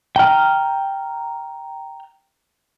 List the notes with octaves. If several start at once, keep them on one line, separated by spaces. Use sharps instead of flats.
G5 A#5 F6